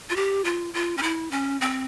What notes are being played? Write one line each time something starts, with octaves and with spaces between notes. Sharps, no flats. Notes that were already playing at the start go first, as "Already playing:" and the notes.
F4
G4
F4
F4
C#4
E4
C#4
C4